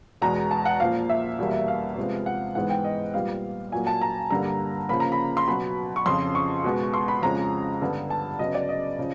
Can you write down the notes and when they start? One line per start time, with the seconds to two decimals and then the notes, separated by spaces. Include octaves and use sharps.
0.21 E2 B2 G#3 A#5
0.51 A5
0.65 F#5
0.80 A#2 F3 A#3 F5
1.09 E5
1.39 E2 B2 G3 A#3
1.68 F5
1.97 C3 F3 G#3 B3
2.26 F#5
2.55 G#2 E3 G#3 B3 F#5
2.70 G5
2.84 D#5
3.14 A#2 G3 B3 F5
3.72 A#2 F#3 A#3 G#5
3.87 A5
4.01 A#5
4.30 G2 D3 G3 A#3 A#5
4.89 C#3 F3 A#3 B5
5.00 A#5
5.12 B5
5.37 C6
5.47 B2 F#3 B3 B5
5.96 C#6
6.06 F2 C#3 F3 C6
6.35 C#6
6.64 B2 G#3 B3
6.94 C6
7.08 B5
7.22 F2 C#3 F3 G#3 A#5
7.82 G2 D3 G3 B3
8.10 A5
8.39 C#3 F#3 B3 D#5
8.55 D5
8.69 D#5
8.99 C#3 F3